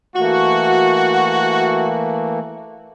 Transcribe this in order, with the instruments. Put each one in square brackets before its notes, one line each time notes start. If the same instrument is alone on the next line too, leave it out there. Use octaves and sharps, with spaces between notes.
[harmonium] E3 A3 A#3 [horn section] F#4